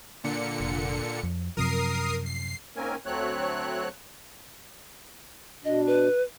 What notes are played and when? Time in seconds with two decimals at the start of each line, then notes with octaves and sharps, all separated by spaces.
0.24 A#2 D3 C#7
0.60 F1
1.23 F2
1.57 F#2 C3 F3 A#4 D#6 C7
2.26 C7
2.76 G#2 A#3 C4 C#4 A#4 G#5
3.06 D2 F#3 A3 C4 C#5 F#6
5.65 B2 D4 D#5
5.87 B4